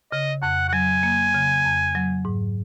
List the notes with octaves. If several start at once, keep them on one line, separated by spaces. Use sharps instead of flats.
C#3 D#5
F2 F#5
F#5
F#3 G#5
A#3
C#3
F2
F#3
G#2